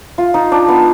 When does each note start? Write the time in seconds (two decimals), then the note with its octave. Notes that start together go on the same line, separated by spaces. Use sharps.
0.18 F4
0.34 D#4
0.52 D4
0.68 B3